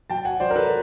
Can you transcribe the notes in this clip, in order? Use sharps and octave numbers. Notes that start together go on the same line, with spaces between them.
F#3 G5 A5
F#5 G#5
F#3 C5 D5
A#4
A4 B4